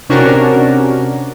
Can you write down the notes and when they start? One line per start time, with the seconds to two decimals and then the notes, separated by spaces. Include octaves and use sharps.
0.09 C3 C#4 D4 F#4 A#4